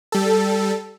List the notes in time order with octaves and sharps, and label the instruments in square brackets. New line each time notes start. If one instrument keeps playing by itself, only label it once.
[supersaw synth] G3 A4